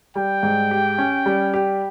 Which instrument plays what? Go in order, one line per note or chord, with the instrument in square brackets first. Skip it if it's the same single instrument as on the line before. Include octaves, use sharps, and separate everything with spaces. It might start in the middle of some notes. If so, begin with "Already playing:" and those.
[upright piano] G3 [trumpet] G5
[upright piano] G#2
G4
C#4
G3
G4